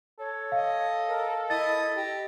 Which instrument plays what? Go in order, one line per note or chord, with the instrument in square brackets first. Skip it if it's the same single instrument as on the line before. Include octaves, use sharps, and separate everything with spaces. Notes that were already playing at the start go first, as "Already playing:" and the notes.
[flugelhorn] A4 [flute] C#5
[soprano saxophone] D#5 [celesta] F5
[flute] A#4
[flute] E4 [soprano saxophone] D#5 [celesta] A6
[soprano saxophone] G4 [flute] D#5